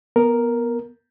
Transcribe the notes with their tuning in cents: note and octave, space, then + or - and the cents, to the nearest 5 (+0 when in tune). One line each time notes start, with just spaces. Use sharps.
B3 -20 A#4 +0